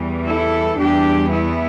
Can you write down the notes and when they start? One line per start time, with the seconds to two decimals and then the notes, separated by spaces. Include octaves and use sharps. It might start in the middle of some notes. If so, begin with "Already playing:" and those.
Already playing: E2 E3 G3
0.26 E4 A4
0.78 E2 E3 G3 D4 G4
1.31 B3 E4